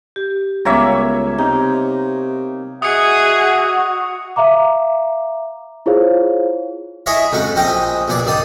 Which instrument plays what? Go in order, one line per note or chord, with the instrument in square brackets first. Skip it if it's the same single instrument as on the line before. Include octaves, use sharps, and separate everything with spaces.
[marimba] G4
[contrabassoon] C#2 [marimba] G3 B3 [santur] A#3 C#5 E5
[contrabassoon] C3 [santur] D#4
[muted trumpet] F#4 [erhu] G#4 [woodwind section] D#5 E5 F#5 [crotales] D#6 C#7
[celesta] E5 F5 A#5 D6
E4 F4 G#4 C5 C#5 F5
[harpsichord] E4 G#4 C#5 D#5 E5
F2 G#2 C#4 F#4
A#1 C4 C#4 D#5 G5 D#6
A#1 B2 G#4 D5 D6
F#2 D#3 D5 A5 D#6